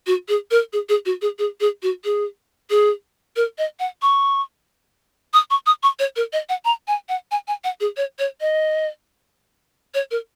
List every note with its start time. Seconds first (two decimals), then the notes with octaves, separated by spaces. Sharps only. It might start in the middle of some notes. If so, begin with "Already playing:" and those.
0.07 F#4
0.28 G#4
0.51 A#4
0.73 G#4
0.89 G#4
1.06 F#4
1.22 G#4
1.39 G#4
1.60 G#4
1.83 F#4
2.05 G#4
2.70 G#4
3.36 A#4
3.58 D#5
3.79 F#5
4.02 C#6
5.33 D#6
5.50 C#6
5.66 D#6
5.83 C#6
5.99 C#5
6.16 A#4
6.33 D#5
6.49 F#5
6.65 A#5
6.88 G#5
7.09 F#5
7.31 G#5
7.48 G#5
7.64 F#5
7.80 G#4
7.97 C#5
8.19 C#5
8.41 D#5
9.94 C#5
10.11 A#4